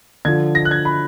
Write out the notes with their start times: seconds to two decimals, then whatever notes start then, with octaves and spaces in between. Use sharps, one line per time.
0.25 D3 F3 G#6
0.55 A#6
0.65 F#6
0.71 G#6
0.85 B5